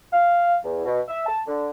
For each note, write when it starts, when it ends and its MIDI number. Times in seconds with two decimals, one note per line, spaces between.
0.12 0.56 77
0.64 0.83 40
0.86 0.99 47
1.08 1.24 76
1.27 1.40 81
1.47 1.70 50